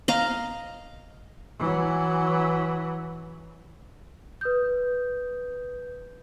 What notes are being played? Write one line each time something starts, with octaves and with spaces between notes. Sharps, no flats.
D#5 F5 A#5
E3 F#3
B4 D#6 G6